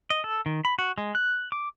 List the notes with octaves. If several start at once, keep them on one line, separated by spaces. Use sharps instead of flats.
D#5
A4
D#3
B5
F#4
G#3
F#6
D6